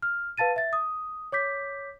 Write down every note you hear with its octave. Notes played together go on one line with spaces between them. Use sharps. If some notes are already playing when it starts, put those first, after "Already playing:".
F6
B4 F5 A5 A6 D#7
E5 A6
D#6
C#5 D6 G6 B6